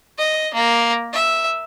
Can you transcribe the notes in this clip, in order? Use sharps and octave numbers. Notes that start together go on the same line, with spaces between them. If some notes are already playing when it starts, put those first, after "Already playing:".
D#5
A#3
E5